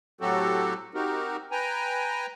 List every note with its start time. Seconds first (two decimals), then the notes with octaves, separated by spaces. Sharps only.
0.21 A2 F#3 C4 F#4 G4 A4
0.94 C4 D#4 F#4 G4 A#4
1.51 B4 G5 G#5 A#5